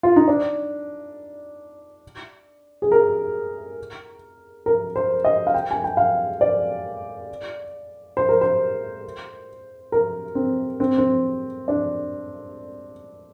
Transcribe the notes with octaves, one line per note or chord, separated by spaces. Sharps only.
F4
D#4
D4
G#4
A#4
A#4
C5
D#5
F5
G5
G#5
G5
F5
D5
C5
A#4
C5
A#4
C4
C4
C4
D4